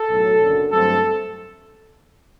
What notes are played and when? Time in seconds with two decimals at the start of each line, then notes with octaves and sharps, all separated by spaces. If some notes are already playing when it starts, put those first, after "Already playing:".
Already playing: A4
0.09 B1 A2 F#3
0.41 F#1 F#2 D3
0.71 G2 F#3 A3 C4 A4